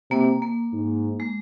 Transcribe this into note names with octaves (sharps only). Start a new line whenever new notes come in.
C3 A#3
A#3
G#2
G#3